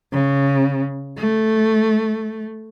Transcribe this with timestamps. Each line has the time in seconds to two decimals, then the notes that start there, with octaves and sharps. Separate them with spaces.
0.12 C#3
1.17 A3